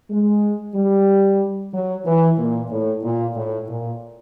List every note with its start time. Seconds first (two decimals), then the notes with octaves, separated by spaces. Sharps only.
0.10 G#3
0.75 G3
1.73 F#3
2.06 E3
2.38 A#2
2.71 A2
3.03 A#2
3.36 A2
3.69 A#2